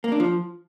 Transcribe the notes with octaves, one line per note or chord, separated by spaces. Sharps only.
A#3
D4
F3